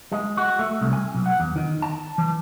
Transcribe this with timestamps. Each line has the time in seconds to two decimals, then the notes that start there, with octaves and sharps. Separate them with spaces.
0.12 G#3
0.37 F#4
0.59 A3
0.81 C2
0.93 G#5
1.14 B1
1.26 F#5
1.40 E2
1.56 D#3
1.82 A5
2.18 E3